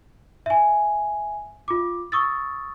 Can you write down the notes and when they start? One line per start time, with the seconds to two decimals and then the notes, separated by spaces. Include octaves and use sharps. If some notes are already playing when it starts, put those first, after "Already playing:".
0.46 E5 G#5
1.68 F4 D6
2.12 C#6 D#6 E6 A6